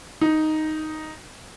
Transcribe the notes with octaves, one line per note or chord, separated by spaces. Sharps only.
D#4